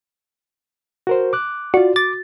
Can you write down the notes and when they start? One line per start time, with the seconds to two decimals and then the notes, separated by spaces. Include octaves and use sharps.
1.07 F#4 A#4 C5
1.33 D6 F#6
1.74 F4 F#4 D5
1.96 D6 A6